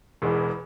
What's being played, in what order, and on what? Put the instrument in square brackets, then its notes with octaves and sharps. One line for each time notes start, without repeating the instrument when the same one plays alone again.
[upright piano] E1 E2 E3 G#3